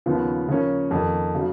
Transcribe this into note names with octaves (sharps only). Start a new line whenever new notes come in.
D#2 C#3 F3 B3
C#3 F3 A#3 C#4
F2 D#3 A#3
C#3 F#3